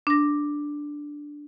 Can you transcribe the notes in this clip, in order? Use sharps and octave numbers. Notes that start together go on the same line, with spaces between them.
D4 A#6